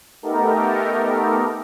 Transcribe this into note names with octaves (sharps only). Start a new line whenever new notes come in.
A3 B3 D#4 G4 A4 A#4